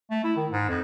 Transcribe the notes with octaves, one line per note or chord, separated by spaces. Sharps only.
A3
E4
D#3
G#2
F2